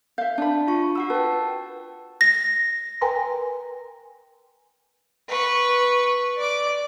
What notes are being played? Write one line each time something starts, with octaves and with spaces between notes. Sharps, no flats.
E5 F5 G6
D4 A5 B5
F4 C#6
F#4 F#5 E6
B4 G5 A5
A#6
A#4 B4 G5 G#5 A#5 C6
B4 C#6
D5 D6